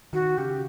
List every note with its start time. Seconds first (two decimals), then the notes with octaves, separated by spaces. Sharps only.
0.13 D#3 F#4
0.37 C#3 G4